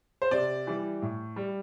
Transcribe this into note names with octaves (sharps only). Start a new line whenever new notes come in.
C5
C3 D5
E3 G3
A2
G3